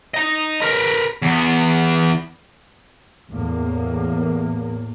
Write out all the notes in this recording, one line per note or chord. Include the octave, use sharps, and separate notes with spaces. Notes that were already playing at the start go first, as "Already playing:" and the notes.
D#5 A#5
A#4 B4
E2 B3
E2 A2 A#3